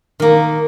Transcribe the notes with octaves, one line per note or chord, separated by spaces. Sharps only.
D#3 A#3